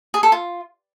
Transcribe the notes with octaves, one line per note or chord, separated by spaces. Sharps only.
G#4
A4
F4